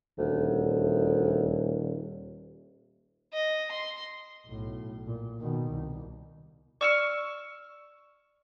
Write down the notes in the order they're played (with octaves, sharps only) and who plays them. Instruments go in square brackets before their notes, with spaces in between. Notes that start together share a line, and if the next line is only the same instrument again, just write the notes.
[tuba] D#1 [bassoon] D2
[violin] D#5
C6
[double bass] B1 A2
A#2
B2 D#3
C2
[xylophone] D5 C#7 [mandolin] C#6 E6 F6